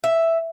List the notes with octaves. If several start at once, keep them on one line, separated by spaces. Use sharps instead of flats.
E5